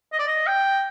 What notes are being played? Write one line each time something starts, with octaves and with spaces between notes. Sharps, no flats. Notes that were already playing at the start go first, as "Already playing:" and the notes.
D#5
D5
D#5
G5